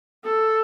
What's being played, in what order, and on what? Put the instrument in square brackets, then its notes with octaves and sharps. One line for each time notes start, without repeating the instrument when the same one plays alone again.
[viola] A4